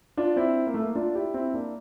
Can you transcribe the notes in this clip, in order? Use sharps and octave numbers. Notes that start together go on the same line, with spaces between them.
D4 F4
C4 E4
A#3
A3
A#3
D4 F4
E4 G4
C4 E4
A#3 D4